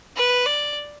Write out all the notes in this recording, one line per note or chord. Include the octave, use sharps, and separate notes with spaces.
B4
D5